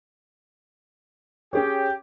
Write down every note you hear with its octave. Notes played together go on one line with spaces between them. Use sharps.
C#4 G4 G#4 C#5 G5